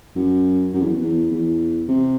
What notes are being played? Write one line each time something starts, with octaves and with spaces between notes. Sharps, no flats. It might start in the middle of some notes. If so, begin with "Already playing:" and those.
F#2
F#2
E2
E2
E2
C3